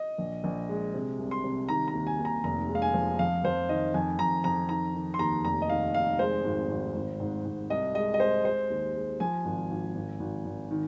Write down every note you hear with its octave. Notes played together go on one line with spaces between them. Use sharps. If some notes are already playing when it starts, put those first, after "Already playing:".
Already playing: D#5
A#1
A#1
G#3
C3
C2
C6
C3
D#3 A#5
A#5
D#2
G#5
D#2
A#5
F1 A#5
G#3
F5
G#5
F3
F2 F5
F2 C5
D#3 D#5
F2 G#5
F2 A#5
F2 A#5
D#3 A#5
D#3
C6
D#2 A#5
F1 A#5
D#5
D#3 F5
F1 F5
G#3 C5
G#1
G#1
G#1
G#2
G#2
C2 D#5
G#3 D#5
D#5
G#3 C5
G#3 C5
D#2
G#3
F3 G#5
G#1
G#1
G#1
G#1
G#1
D#3